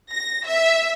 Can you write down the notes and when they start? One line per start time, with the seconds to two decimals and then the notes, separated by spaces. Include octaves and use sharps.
0.11 A#6
0.46 E5